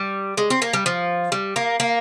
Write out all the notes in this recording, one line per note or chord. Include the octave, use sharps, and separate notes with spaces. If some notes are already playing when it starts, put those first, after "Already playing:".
Already playing: G3
G#3
C4
A#3
G3
F3
G3
A#3
A#3